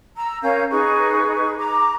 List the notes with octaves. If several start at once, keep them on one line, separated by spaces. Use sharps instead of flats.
A#5 E6
C#4 A#4 F5 G6
D#4 G#4 B4 C#6
A#5 D6